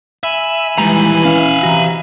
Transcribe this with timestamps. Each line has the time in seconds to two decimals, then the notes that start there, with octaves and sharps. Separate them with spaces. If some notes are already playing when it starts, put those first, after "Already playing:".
0.23 E5 G#5 B5
0.78 D#3 E3 G3 G#3 A#5
1.25 C#4 E5 F5
1.63 C3 E3 F#4 A#5